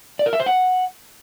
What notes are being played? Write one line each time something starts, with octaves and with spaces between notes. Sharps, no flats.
D5
A#4
E5
C5
F#5